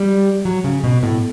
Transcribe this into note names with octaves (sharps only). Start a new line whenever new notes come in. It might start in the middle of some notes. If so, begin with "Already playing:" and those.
Already playing: G3
F#3
C#3
B2
A2